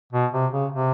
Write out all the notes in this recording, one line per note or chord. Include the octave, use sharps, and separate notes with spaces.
B2
C3
C#3
C3